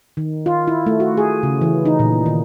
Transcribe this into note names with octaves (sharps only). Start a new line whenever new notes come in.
D#3
F4
E4
A3
F#4
G#4
C#3
E3
D#4
A#2
D#3